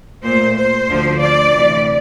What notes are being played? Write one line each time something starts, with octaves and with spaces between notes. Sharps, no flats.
A#2 A3 C5
C5
D2 D3 F3
D5
D2 C3 E3